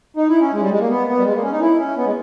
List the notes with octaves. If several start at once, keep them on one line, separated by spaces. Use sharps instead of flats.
D#4
E4
C#4
G#3
G3
G#3
A#3
B3
B3
G3
G#3
A#3
C#4
D#4
E4
C#4
B3
G#3